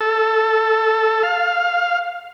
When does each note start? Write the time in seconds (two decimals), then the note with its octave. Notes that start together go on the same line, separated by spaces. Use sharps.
0.01 A4
1.23 F5